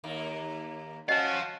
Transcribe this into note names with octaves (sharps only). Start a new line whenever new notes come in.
D#2 A#3
C#4 F#4 D#5 F5 A5